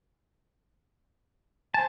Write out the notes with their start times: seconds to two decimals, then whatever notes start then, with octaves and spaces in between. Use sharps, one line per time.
1.74 C5 G#5 A5